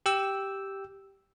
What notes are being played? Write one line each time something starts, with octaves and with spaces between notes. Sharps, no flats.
G4 G5 E6